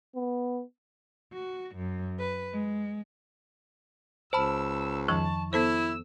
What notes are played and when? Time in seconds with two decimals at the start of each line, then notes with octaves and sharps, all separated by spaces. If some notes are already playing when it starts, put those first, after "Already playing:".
0.16 B3
1.34 F#4
1.76 F#2
2.18 B4
2.54 G#3
4.33 C#2 C5 A5 B5 E6
5.08 F2 D#3 F3 A5 C#6
5.53 B3 E4 A4 C5 E6